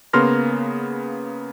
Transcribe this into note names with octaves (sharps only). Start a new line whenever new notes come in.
C#3 A#3 B3 C6 F6 A#6